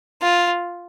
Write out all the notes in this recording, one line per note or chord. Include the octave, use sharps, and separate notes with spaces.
F4